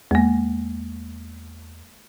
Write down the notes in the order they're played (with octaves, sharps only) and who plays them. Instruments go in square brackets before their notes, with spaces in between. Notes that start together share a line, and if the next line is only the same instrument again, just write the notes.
[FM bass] E2 [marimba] G#3 A#3